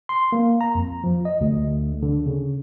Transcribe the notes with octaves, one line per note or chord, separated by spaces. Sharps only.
C6
A#3
A#5
F2
F3
D#5
D2
D3
C#3